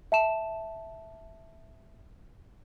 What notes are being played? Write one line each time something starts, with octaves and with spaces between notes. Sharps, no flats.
E5 A5 E7